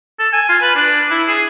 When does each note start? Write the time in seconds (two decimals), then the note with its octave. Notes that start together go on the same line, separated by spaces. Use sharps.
0.19 A4
0.33 G#5
0.49 F4
0.62 B4
0.76 D4
1.11 E4
1.28 G#4